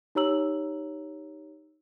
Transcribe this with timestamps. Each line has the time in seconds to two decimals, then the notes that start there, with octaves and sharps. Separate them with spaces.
0.15 D#4 G4 C#5 A#5 E6 F#7